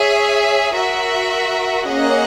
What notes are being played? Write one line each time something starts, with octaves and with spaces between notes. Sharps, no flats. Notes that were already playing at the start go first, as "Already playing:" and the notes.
Already playing: G#4 C#5 E5
F#4 A#4 E5
A#3 C#4 G#4 D#5 F#5